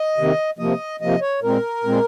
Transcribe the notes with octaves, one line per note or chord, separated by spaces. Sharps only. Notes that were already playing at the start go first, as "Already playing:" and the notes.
Already playing: D#5
C3 D#3 A#3
C3 F3 A#3 D#5
C3 F3 A#3 D#5
C#5
A#2 G#3 C4 A#4
A#2 G#3 C4